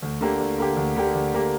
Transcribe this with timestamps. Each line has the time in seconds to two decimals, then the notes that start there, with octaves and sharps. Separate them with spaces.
0.02 D2
0.21 D3 A#3 G4
0.40 D2
0.58 D3 A#3 G4
0.77 D2
0.96 D3 A#3 G4
1.15 D2
1.34 D3 A#3 G4